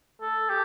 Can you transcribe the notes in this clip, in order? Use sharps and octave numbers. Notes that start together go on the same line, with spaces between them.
A4
G4